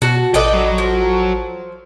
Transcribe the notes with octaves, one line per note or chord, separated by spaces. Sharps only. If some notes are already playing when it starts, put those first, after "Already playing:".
B2 F#4 A5
A1 D4 A4 B4 D#5 G5
F#3
F3